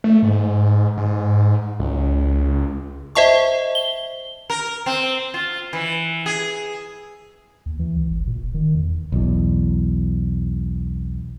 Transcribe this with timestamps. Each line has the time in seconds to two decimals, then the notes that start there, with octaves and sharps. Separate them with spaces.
0.04 A3
0.23 G#2
0.98 G#2
1.80 C#2
3.15 C5 D#5 E5 A5 C#6
3.75 G7
4.50 A#4
4.86 C4
5.34 F4
5.73 E3
6.26 G#4
7.66 D#2
7.79 E3
7.96 C#2
8.11 G#1
8.27 A#2
8.42 E1
8.54 D#3
8.75 E2
9.12 B1 E2